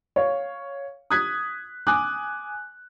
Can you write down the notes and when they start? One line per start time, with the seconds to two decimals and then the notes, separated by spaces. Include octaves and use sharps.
0.16 C#5 F5
1.10 D#6 F#6 G#6 B6
1.87 G#5 D6 D#6 F#6